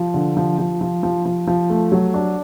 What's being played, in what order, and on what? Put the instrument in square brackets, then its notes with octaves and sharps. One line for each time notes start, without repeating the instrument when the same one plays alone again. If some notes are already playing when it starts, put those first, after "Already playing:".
Already playing: [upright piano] F3
D3
F3
F3
F3
F3
F3
F3
A3
F#3
D4